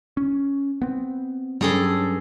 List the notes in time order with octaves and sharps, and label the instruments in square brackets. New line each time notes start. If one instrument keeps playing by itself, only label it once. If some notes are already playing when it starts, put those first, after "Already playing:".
[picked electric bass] C#4
B3 C4
[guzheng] G2 G#4 A4 [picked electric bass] F#3 G3 C#4